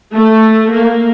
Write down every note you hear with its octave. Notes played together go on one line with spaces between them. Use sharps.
A3
A#3